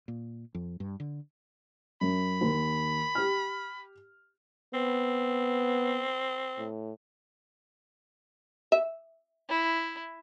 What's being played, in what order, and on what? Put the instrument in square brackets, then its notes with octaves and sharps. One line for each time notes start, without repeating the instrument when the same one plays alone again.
[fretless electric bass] A#2
F2
G2
D3
[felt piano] F#2 [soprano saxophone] B5
[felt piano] D#2
G4 F6
[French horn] B3 [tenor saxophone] C4
[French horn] A2
[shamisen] E5
[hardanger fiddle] E4